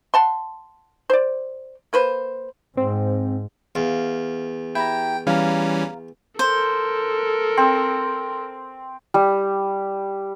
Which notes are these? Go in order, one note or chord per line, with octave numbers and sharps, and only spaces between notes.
F#5 A5 C6
C5 D5
A#3 B4 C5
G#2 C4
E2 F5
E4 G4 G5 A#5
E3 G3 C#4 F5 A#5
A4 A#4 C5
C4
G3